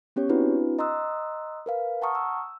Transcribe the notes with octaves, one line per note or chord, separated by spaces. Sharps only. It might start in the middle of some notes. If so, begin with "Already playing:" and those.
B3 C#4 G4 C#5
C4 D4 E4 F#4 B4
D#5 A#5 C6 D#6 E6 F#6
A#4 B4 F5
F#5 A5 A#5 C#6 D#6 F6
E6